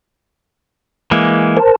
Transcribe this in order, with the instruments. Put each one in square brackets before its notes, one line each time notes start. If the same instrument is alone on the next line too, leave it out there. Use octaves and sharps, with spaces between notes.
[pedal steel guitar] E3 G#3 A#3
[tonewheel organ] A#4 C5 A5